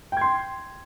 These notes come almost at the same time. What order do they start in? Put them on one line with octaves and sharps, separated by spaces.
G5 G#6 C6